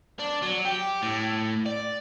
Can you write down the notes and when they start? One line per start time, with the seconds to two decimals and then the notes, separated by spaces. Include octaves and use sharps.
0.19 D4
0.42 F#3
0.65 G4
1.02 A2
1.66 D5